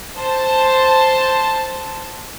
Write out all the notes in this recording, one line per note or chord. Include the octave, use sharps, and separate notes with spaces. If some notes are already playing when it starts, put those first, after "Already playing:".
C5 A5